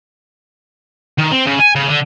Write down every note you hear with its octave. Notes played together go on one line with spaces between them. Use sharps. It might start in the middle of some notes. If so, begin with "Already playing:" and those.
D#3
C4
C#3
G#5
C#3
D3